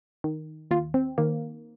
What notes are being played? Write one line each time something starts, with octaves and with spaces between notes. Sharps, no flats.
D#3
D#2 F4
C4
D#3 A#3